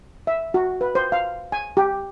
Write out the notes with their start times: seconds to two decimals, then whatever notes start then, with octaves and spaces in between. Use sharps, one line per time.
0.27 E5
0.54 F#4
0.81 B4
0.95 C5
1.12 F5
1.52 G#5
1.77 G4